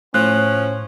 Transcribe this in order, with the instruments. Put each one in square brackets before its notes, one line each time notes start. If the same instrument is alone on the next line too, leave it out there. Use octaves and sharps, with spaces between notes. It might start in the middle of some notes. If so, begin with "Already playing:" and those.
[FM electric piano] A2 [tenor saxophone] F3 [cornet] C#4 [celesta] F#6